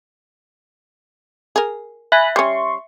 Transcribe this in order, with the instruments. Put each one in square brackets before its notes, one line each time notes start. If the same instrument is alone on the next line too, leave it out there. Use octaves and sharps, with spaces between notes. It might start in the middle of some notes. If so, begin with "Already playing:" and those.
[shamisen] G#4 A#4
[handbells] E5 [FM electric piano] G#5 B5 F#6
[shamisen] G3 C#4 [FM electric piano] C6 C#6